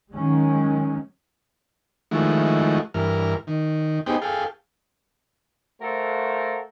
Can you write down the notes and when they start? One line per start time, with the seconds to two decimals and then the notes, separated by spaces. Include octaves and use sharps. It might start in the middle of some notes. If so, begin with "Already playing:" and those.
0.12 D#3 F#3 G#3 C#4
2.11 D#3 F3 G#3 A3 E4 F#4
2.94 G2 E3 A#4 F6
3.47 D#3
4.06 B3 D#4 G4 G#4 C5 G5
4.22 G#4 A4 F5 G5
5.81 A3 F#4 A4 A#4 C5 F5